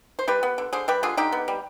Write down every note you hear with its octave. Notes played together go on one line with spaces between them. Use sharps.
C5
G3 G4 B4
B3
D3
D3 G#4 C5
G3 G4 B4
D3 F4 G#4
D3 D#4 G4
B3
G3